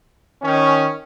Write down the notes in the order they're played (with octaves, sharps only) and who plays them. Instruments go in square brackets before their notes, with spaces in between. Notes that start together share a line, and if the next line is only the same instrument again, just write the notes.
[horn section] D#3 C#4